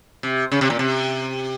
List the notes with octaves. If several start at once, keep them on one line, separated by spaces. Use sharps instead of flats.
C3
C#3
C3
A#2
C3